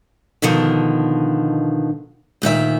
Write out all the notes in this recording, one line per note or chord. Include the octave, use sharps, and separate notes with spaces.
B2 D3 D#3 F3
D2 A#2 D#3 E5